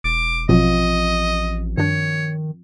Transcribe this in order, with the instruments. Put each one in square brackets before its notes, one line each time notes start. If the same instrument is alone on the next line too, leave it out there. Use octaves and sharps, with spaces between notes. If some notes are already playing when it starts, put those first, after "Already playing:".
[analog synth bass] E1 [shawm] D6
[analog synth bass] A1 [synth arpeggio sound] B2 F#3 [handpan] F3 C4 F4 [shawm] D#5
[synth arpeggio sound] G2 D4 [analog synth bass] D#3 [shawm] C#5